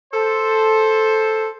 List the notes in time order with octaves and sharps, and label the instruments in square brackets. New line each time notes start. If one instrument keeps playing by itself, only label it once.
[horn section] A4 C5